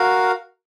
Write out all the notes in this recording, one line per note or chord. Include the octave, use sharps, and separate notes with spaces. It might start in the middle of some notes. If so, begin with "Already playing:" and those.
Already playing: F#4 A#4 F5